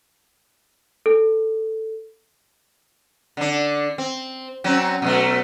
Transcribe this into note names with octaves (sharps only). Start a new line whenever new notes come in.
A4
D3 D4
C4
F#3 C4 C#4
B2 F#3 A3